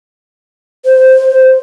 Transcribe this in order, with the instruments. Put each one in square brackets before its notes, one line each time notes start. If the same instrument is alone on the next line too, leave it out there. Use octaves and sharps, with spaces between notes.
[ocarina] C5